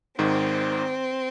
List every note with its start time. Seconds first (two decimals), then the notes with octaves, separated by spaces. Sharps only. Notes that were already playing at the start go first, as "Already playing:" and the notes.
0.19 G#1 G#2 D#3 C4